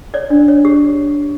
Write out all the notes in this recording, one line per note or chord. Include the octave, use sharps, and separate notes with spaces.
C#5 D5
D4
C#5
G4